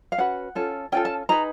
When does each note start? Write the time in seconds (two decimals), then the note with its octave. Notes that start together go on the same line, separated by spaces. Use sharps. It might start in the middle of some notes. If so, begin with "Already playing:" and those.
0.12 F5
0.18 C#4 F#4 B4 F#5
0.55 C#4 F4 A4
0.92 C#4 F4 A4 G5
1.05 A5
1.29 D#4 G#4 B4 A#5